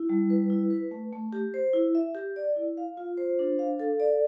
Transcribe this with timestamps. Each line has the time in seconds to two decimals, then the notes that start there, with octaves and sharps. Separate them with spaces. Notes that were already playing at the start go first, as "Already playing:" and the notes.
Already playing: E4
0.09 G3
0.30 B4
0.50 E4
0.70 B4
0.91 A3
1.13 A3
1.33 G4
1.54 C5
1.73 E4
1.95 E5
2.15 G4
2.36 D5
2.56 E4
2.77 F5
2.97 F4
3.17 C5
3.39 D4
3.59 F5
3.79 A4
4.00 D5